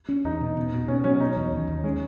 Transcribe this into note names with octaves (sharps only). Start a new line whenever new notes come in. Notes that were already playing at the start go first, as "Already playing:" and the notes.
C#4
E2 D#4
B2
B2
B2
B2 C#4
F#3 C#4
B2 D#4
E2
D#2
D#2
G#3 C#4